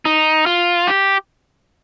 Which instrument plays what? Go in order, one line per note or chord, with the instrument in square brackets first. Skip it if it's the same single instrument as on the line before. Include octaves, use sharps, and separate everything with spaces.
[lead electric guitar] D#4
F4
G4